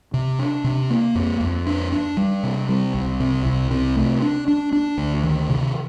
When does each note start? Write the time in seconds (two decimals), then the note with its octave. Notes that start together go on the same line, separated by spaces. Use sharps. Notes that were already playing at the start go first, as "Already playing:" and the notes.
0.14 C3
0.39 D4
0.64 C3
0.90 A#3
1.15 F2
1.40 F2
1.67 D4
1.92 D4
2.17 G3
2.43 C3
2.69 G3
2.94 C2
3.20 C3
3.45 C2
3.71 C3
3.96 A3
4.22 D4
4.48 D4
4.73 D4
4.98 D2
5.23 D#3
5.49 C3